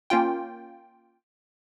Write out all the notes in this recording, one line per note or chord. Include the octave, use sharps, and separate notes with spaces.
A#3 C#4 F4 G5